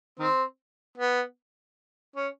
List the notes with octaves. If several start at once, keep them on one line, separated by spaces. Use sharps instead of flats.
D#3 C4
B3
C#4